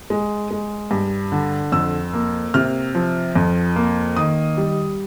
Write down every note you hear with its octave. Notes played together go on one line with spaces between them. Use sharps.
G#3
G#3
G2
D3
F2 E6
A#3
C3 F6
F3
F2
A#3
D#3 D#6
G3